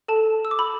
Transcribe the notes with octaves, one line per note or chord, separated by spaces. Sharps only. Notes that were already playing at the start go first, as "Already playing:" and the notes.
A4 A5
E6
D6
B5